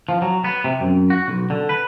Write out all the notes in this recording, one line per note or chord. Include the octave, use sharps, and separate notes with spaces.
F3
F#3
B3
C3
F#2
F#4
B1
D3
B4